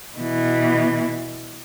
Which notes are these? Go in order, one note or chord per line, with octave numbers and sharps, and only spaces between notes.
B2 E3